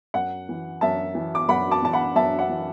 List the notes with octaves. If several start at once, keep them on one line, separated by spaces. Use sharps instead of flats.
F#2 F#5
E3
F#2 E5 A5
E3
D6
F#2 F#5 B5
A5 D6
E3 A5
F#5 B5
F#2 E5 A5
F#5
E3